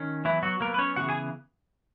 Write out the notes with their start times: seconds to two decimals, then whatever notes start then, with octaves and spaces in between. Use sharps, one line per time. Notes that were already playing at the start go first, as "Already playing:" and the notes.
Already playing: D#3 C#4
0.25 E3 F#3 B3 E4
0.43 F#3 F#4
0.60 F#3 A#3 B3 A#4
0.74 B4
0.78 C#4 C#5
0.96 C#3 E3 B3 F#4 F#5
1.09 G#4 G#5